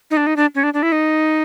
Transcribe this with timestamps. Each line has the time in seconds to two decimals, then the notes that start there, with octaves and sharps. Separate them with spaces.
0.11 D#4
0.17 D4
0.27 D#4
0.36 D4
0.55 C#4
0.63 D4
0.74 D4
0.83 E4
0.92 D#4